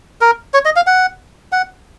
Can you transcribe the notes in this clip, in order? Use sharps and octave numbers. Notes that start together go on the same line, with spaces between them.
A#4
C#5
D#5
F5
F#5
F#5